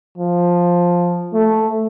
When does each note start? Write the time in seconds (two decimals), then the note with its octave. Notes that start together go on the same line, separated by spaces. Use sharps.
0.18 F3
1.33 A3